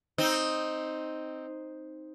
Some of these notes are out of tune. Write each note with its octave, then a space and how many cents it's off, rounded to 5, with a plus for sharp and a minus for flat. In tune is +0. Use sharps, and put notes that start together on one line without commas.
C4 +0 D#4 +0